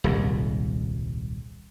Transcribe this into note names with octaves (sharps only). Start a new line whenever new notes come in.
D#1 C2 G#2